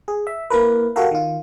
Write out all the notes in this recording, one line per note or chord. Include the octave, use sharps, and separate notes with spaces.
G#4
E5
A#3 E4 A#4 B4
F#4 G4 A4 A#4 F5
D#3 F4